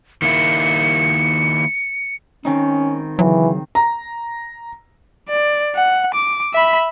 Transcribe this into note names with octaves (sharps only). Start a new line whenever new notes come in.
D#3 A#3 E4 C#7
D#3 C4 C#4 D#4
C#3 E3 F#3
A#5
D5
F#5
D6
E5 B5